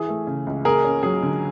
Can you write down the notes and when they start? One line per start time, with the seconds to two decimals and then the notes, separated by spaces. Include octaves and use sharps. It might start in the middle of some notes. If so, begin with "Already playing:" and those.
Already playing: E3 G#4
0.09 A3
0.27 C#3
0.47 C#2
0.65 A#3 G#4 A#4
0.84 C#4
1.03 F#3 G#4
1.23 D3